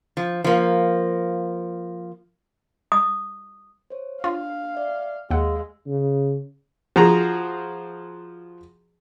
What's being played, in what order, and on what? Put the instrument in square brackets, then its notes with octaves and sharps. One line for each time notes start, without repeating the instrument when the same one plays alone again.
[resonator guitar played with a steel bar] F3
F3 A#3
[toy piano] D#6
[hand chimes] C5 C#5
[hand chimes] D4 [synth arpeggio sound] F4 [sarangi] F5
[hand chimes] D5 E5
[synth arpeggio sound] D#2 F#5 [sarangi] G#3 [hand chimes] F5 E6
[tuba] C#3
[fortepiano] F3 F#4 G#4 A#5